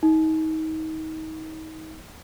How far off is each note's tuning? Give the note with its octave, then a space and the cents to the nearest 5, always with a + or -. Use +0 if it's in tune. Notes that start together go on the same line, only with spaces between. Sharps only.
D#4 +30